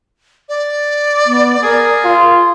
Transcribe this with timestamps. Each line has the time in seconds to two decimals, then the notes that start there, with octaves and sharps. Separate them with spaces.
0.49 D5
1.26 B3
1.63 G#4 A#4
2.05 F4